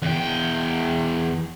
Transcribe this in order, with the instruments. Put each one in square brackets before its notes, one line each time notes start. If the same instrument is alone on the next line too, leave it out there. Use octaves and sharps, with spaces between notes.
[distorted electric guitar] E2 G5